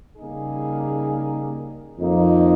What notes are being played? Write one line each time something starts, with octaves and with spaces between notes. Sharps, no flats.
C#3 G3 A#3 D#4 G#4
F2 D#3 A#3 D#4